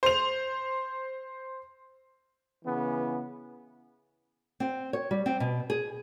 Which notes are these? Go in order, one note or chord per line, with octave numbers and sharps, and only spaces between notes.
C5 F7
C#3 E3 B3
C4
C#5
G3
C4
B2
G#4